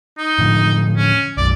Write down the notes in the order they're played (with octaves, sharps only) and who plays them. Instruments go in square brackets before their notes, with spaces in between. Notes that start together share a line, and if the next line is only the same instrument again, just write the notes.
[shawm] D#4
[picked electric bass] A2 D3 F3
[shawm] C#4
[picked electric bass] B1 F#2 [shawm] D5